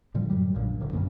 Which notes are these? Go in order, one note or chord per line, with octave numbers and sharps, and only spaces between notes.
A2 D3 F3 G3
F#2 A2 F#3 G3
A#1 A#2
D1 D3
F#2 B3 C#4